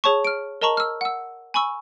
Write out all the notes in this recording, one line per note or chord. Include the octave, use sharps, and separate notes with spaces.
G#4 C#5 A5 C#6
F6 D7
A#4 D#5 A5 A#5 C#6 F#7
E6 F6
F#5 E6
G#5 B5 C#6 E6